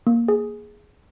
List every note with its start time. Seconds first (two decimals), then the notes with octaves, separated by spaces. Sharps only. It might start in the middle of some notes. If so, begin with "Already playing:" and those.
0.07 A#3
0.28 G#4